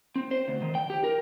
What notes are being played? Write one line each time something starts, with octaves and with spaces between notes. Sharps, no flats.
C4
C5
D2
D#3
G5
G4
A#4